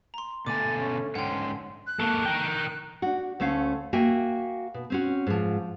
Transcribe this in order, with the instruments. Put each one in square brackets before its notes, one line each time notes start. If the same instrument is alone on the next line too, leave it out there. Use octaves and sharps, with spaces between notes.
[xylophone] A#5 C6
[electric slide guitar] B2 D3 G#5 [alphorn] A3 [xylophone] D6 [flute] A6
[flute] C#4
[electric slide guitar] G#2 D3 C#4 [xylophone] F#5 G5 [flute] C6
[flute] F#6
[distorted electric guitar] A#3 A4
A#4 G5
[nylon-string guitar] D4 F#4
D2 A3 C#4 F5
A#3 F#4 E5 G5 G#5
B2
C4 C#4 F#4
G#2 F3